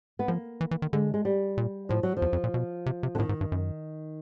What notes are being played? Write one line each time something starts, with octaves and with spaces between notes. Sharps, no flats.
B3
F3 A#3
E3
E3
D#3
D3 G#3
G#3
G3
A#2
A2 F3
F#3
F3
E2
F2
A#2
B2
C3
C3
D3
A2 D#3
G#2
G2
F#2